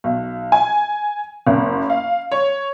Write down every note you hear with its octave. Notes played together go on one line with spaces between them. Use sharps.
B1
G#5
F#1
F5
C#5